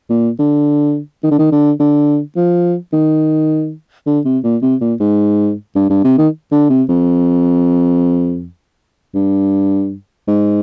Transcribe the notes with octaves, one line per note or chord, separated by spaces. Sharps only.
A#2
D3
D#3
D3
D#3
D3
D3
F3
D#3
D3
C3
A#2
C3
A#2
G#2
G2
G2
C3
D#3
D3
C3
F2
G2
G#2